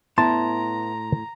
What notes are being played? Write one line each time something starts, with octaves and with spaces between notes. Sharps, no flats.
A2 B3 E4 A5 A#5 C6